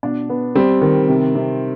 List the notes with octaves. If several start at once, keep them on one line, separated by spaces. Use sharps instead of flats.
B2 D4
B3
G3 C4
D#3
C3
C3